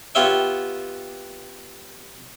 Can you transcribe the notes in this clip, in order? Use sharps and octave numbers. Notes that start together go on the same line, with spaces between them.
B3 F4 G4 C#5 E5 G5